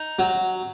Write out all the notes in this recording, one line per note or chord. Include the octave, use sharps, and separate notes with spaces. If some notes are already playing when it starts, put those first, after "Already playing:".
Already playing: D#4
F#3